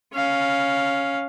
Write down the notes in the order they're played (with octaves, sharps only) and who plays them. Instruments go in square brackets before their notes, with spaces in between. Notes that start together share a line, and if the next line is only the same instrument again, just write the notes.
[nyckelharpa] C#4 F5